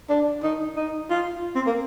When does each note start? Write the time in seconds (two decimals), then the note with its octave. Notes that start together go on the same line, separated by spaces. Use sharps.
0.09 D4
0.43 D#4
0.76 D#4
1.10 F4
1.55 C4
1.66 A#3